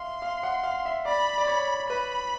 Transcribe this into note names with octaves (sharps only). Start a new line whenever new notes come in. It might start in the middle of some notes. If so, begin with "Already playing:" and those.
Already playing: E5 F5 C6
F5
F#5
F5
E5
D5 B5
D5
C#5
B4 B5